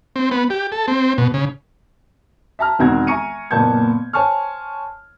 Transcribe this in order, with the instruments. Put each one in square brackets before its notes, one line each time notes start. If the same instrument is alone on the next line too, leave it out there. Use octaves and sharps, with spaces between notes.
[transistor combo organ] C4
B3
G4
A4
C4
B2
C#3
[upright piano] E5 A5 A#5 F6
E1 D#3 C4 F#4 A#5 G#6
E5 G#5 A#5 C#6 C#7 D#7
F#1 A#2 B3 A5 G6 G#6
C5 C#5 G#5 A5 C#6 F6